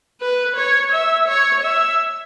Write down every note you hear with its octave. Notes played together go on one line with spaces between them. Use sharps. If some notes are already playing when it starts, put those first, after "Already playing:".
B4
C#5
E5
C#5
E5